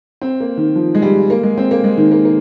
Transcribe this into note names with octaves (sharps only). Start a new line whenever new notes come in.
C4
A#3
D#3
F3
G#3
G3
A#3
G#3
C4
A#3
G#3
D#3
A#3
A#3